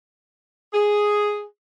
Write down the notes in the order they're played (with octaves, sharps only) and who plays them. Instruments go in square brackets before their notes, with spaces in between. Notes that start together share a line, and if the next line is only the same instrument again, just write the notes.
[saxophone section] G#4